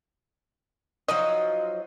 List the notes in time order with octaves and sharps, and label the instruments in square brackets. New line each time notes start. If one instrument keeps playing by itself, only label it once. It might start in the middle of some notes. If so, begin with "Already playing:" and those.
[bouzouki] F3 F#3 D#4 [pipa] D#5